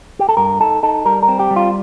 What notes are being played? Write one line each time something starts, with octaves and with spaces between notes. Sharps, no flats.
G4
A4
G2 A#4
D#4 A4
D#4 A4
G3 A#4
A#4
C4
G4
G3
F4